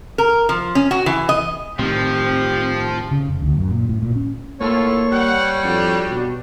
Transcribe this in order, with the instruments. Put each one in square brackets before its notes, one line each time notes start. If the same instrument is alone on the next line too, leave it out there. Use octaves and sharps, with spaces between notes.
[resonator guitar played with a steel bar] A#4
F3
C#4
F#4
E3
D#5
[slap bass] A2 D#3 [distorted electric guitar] F3 [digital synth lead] C4 [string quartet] G4
[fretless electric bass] C#3
F1
D2
F#2
A#2
A2
A#2
C#4
[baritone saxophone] A2 [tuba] A#3 [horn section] E4 F4 A4 [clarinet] C#5
[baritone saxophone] G3 [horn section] F#5
[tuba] F2 [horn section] D4 F#4
[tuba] B2